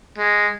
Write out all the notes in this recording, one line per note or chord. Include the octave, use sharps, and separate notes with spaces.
G#3